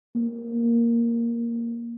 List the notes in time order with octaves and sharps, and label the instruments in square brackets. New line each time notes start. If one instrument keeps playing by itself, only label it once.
[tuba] A#3